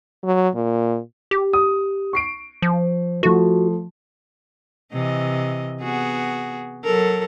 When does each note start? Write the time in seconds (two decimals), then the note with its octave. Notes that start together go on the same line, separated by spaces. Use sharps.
0.24 F#3
0.55 A#2
1.31 G4
1.53 D#6
2.13 C#6 C7 D7
2.62 F3
3.23 F3 A3 F#4
4.93 C3 E3 D#5
5.82 B3 F#4 G#4
6.84 F#3 A4 A#4